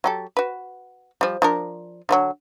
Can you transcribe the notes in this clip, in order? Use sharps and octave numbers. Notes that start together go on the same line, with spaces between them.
F#3 G4 A4
F#4 B4
F3 G3
F3 D4 A#4
D3 F3 F#3